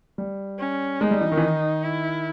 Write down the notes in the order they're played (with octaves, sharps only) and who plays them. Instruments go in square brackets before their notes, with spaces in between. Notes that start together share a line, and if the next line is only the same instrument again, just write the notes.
[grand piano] G3
[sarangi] C#4
[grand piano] G#3 [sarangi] D#4
[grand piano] G3
E3
D#3
E3
D#3
[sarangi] E4